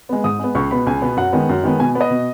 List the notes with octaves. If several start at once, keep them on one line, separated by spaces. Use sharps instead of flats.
G#3 B3
G#2 D#6
G#3 B3
C#2 C#6
B2 B3 B5
C#2 G#5
B2 B3
F#2 F#5
D#3 G#3 B3
F#2
D#3 G#3 B3
B2 G#5
B3
D#5
B2